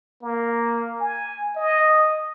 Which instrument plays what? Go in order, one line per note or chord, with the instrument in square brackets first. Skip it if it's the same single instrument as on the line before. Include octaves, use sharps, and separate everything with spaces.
[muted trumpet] A#3
G#5
D#5